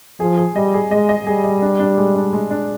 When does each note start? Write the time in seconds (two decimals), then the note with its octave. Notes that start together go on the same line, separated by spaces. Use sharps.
0.20 F3 G#4
0.37 G#4
0.55 G3 D#5
0.74 G#4
0.91 G#3 D#5
1.09 D#5
1.26 G3 G#4
1.44 D#5
1.62 D4
1.79 D4
1.97 G#3
2.15 D4
2.33 G#3
2.51 D4